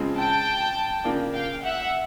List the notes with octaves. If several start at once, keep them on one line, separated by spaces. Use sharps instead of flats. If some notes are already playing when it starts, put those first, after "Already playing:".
Already playing: C#3 F3 G#3 C4
G5 A5
C#3 F3 A#3 D4
F5 G5
E5 F#5